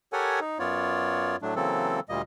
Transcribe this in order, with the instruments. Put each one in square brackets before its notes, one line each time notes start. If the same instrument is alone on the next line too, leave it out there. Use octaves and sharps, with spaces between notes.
[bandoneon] G4 A4 A#4 C#5 F#5 G#5
D#4
F#2 B3 F4 C#5 D5
A2 F#3 A3 D4
C#3 E3 F#3 A#3 C4 A4
D2 A#2 G3 A#3 D#5